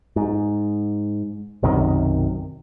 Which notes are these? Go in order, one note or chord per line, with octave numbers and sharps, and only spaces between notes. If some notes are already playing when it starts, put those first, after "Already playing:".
G#2
B1 F#2 C3 D#3